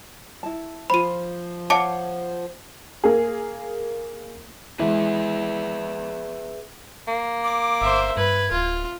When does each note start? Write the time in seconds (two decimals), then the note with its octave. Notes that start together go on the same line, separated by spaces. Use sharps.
0.43 E4 A5
0.90 F3 F4 C5 B5 D#7
1.70 C#5 F5 F#5 A5 D6 C#7
3.04 A#3 G#4
4.79 E3 G#3 G#4 B4 E5
7.08 A#3
7.44 D6
7.82 G1 C5 E5
8.17 G2 B4 G#6
8.51 D1 F4